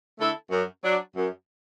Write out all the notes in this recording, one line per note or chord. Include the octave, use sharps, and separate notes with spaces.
D3 A3 E4 A4
F#2
F#3 D4
F#2